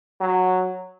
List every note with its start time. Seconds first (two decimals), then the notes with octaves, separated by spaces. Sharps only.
0.21 F#3